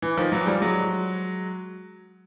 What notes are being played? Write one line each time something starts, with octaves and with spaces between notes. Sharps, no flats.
E3
D#3 F3
E3 F#3
F3 G3
F#3 G#3